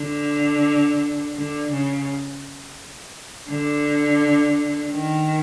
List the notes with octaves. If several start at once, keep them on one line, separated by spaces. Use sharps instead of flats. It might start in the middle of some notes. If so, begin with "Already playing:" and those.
Already playing: D3
D3
C#3
D3
D#3